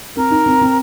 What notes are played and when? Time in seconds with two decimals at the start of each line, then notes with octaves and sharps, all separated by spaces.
0.16 C4 A#4
0.30 D#4
0.46 C4
0.61 C4